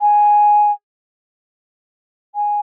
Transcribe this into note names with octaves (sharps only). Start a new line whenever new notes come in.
G#5
G#5